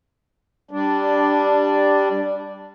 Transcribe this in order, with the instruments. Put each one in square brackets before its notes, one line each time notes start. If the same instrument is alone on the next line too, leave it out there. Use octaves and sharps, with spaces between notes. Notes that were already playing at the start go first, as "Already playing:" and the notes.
[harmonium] G3 D4